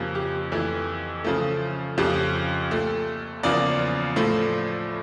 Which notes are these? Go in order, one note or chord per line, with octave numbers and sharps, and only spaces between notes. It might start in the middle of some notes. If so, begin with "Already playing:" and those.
Already playing: F2 C#3 F3 A#3 G4
G4
F2 E3 A3
C#3 F3 A3
F2 C#3 F3 A3 G4
A#2 A3
E2 C#3 F3 A#3 D5
A2 F3 A3